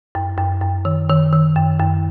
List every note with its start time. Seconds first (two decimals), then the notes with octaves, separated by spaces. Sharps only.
0.15 F#2
0.38 F#2
0.62 F#2
0.85 D#3
1.09 D#3
1.33 D#3
1.56 F#2
1.80 F#2